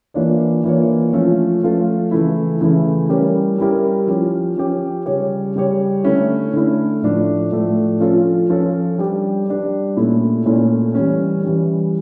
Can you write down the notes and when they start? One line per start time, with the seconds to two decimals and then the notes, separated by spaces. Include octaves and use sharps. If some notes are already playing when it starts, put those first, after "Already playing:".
0.14 E3 A#3 D4 F4 C#5
0.64 E3 A#3 D4 F4 C#5
1.13 F3 A3 C#4 F4 A4
1.62 F3 A3 C#4 F4 A4
2.11 C#3 E3 A3 E4
2.61 C#3 E3 A3 E4
3.09 G3 C#4 E4 G4 A#4
3.58 G3 C#4 E4 G4 A#4
4.07 F3 C#4 G4
4.56 F3 C#4 G4
5.06 C#3 G3 C#4 G4 C#5
5.55 C#3 G3 C#4 G4 C#5
6.04 D3 A3 C#4 E4
6.53 D3 A3 C#4 E4
7.02 A2 F3 A3 D4
7.52 A2 F3 A3 D4
8.00 F3 C#4 F4 A4
8.49 F3 C#4 F4 A4
8.98 G3 D4 G4
9.48 G3 D4 G4
9.97 A#2 A3 C#4 E4
10.46 A#2 A3 C#4 E4
10.95 E3 G3 C#4
11.44 E3 G3 C#4